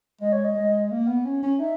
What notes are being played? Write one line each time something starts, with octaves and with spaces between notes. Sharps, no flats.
G#3 D#5
C#5
D#5
G#3
A#3
B3
C#4
C#4
D#4 E5